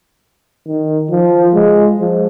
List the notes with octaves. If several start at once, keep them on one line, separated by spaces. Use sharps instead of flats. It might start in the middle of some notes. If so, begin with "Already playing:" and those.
D#3
F3
G#3
F3